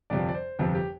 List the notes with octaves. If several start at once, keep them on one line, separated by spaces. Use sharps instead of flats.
G1 F2 C3 F3 D5
D5
C5
G1 F2 C3 F3 C5
G4